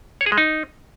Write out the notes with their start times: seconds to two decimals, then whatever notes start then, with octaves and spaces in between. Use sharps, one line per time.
0.21 C#5
0.26 G#4
0.32 G#3
0.38 D#4